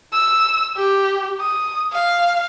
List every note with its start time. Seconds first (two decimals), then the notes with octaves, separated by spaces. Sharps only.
0.13 E6
0.77 G4
1.41 D#6
1.93 F5